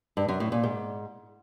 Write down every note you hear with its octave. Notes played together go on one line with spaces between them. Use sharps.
G2
F#2
A2
A#2
G#2